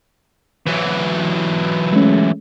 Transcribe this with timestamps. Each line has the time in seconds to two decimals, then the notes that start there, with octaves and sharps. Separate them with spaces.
0.67 E3 F#3
1.92 G#3 A3 C#4